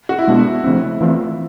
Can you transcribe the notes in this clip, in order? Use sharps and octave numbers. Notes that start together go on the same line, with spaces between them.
F#4
E4
B2 G#3 B3 D4
C#3 F3 A3 C4
E3 A3 C4 F4